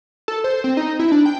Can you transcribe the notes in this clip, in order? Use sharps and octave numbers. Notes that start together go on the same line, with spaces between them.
A4
C5
C4
D#4
E4
D4
G5